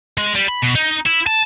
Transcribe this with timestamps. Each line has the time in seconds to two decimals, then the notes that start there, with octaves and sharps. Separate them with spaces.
0.18 G#3
0.35 G3
0.48 B5
0.62 B2
0.75 D#4
1.06 E4
1.27 A5